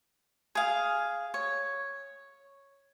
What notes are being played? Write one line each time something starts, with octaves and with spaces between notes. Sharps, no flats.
G#4 F5
C#5